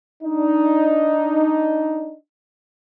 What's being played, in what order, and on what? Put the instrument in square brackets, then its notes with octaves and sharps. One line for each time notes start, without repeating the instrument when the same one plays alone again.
[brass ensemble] D4 D#4